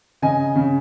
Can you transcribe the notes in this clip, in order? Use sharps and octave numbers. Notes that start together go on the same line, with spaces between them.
C#3 D#5 G#5
C#3